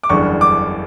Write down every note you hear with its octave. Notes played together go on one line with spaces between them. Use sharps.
D6
F#1 E2 D3 G3 C#6
D6